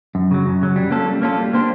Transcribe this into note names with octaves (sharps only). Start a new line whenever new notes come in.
F#2
C#3 F#3
F#2
C#3 F#3
G3
A#3 C#4 F4 A4
G3
A#3 C#4 F4 A4
G3
A#3 D4 G4 C5